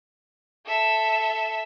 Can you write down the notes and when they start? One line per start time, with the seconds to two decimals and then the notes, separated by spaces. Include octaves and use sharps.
0.66 A4 E5